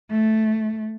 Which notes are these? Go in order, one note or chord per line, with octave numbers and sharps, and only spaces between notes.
A3